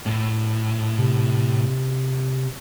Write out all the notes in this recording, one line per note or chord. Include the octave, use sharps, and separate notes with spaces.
A2
C3